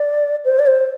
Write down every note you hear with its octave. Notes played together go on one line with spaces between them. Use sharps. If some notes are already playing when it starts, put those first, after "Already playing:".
Already playing: D5
C5
D5
C5